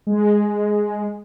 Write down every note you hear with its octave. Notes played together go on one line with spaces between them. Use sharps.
G#3